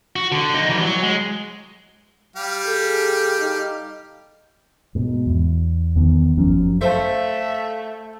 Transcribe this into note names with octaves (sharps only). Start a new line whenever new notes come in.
F#4
D3
D#4 F#4
E3 G3
F#3
G#3
G3 G4 F5
G#4 A4
D#4
G#2 B2
E2
E2 D#3 B3
G1 F#2 F3 C#4
A3 A4 C5 E5 F5 A5